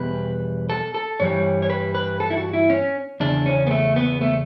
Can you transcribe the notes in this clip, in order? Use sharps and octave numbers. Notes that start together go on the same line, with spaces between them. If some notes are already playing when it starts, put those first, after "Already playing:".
Already playing: E2 B2 G3 B4
A4
A4
G2 E3 G3 C#5
C#5
B4
B4
A4
E4
F#4
E4
C#4
E2 C#3 D4
C#4
B3
A3
B3
A3